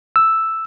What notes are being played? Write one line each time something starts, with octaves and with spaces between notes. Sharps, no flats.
E6